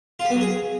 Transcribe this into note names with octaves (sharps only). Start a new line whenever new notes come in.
F4
G4
B3
F#3
G#4